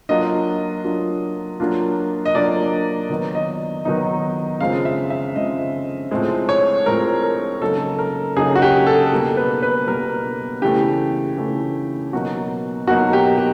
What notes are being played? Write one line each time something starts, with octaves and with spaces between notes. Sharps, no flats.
F#3 A#3 D4 F4 D#5
F#3 A#3 D4 F4
F#3 A#3 D4 F4
D#5
F#3 A#3 D4 F4 D5
D#3 F#3 B3 D#4
D#5
D#3 F#3 B3 D#4
C#3 F3 G#3 C4 F5
E5
E5
C#3 F3 G#3 C4 D#5
A2 F3 G#3 C4
C#5
A2 F3 G#3 C4 A#4
A#4
C#3 F#3 A#3 D#4 A4
A#4
C#3 F#3 A#3 D#4 G#4
F#4
G4
A4
B2 G3 A#3
B4
B4
B2 G3 A#3 A#4
C#3 E3 A3 G4
C#3 E3 A3
B2 F#3 A#3 D#4 F#4
B2 F#3 A#3 D#4 F#4
G4
G4